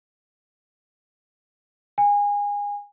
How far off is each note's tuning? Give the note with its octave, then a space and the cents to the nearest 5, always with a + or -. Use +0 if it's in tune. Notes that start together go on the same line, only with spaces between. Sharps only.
G#5 -25